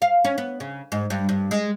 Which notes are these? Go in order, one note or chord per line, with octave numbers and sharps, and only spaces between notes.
F5
C#4
B3
C#3
G#2
G2
G2
G#3